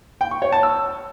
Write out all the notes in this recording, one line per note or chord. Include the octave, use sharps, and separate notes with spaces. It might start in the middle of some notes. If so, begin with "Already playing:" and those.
G5
C#6
C#5
A5
E6